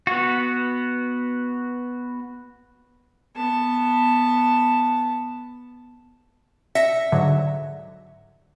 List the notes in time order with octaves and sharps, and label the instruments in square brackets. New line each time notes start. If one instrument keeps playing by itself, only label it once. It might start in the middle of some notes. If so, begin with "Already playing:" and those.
[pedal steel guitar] B3 F#4
[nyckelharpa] B3 A5
[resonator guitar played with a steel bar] E5 [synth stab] A#6 C#7
[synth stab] G#2 D3 F#3